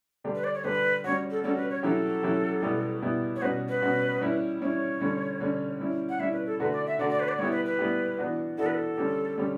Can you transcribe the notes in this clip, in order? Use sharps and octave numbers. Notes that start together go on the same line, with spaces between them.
D3 G3 D4 G4
B4
D5
C#5
D3 G3 D4 G4 B4
G3 C#4 F#4 C#5
A4
G3 C#4 F#4 A4
B4
C#5
F#3 C#4 E4 G4 A4
F#3 C#4 E4 G4
B2 G3 B3 E4 G4
B2 G3 B3 E4 G4
C#5
B2 G3 C#4 F#4 B4
B4
B2 G3 C#4 F#4
G3 C#4 E4
G3 C#4 E4 C#5
D3 G3 C#4
D3 G3 C#4
G3 C#4 E4
F#5
G3 C#4 E4 E5
B4
A4
D3 A3 D4 F#4 B4
D5
E5
D3 A3 D4 F#4 D5
D5
B4
D5
G3 B3 E4 G4 C#5
B4
B4
G3 B3 E4 G4
E3 B3 D4 F#4
E3 B3 D4 F#4 A4
B4
A4
D3 G3 C#4 G4
D3 G3 C#4 G4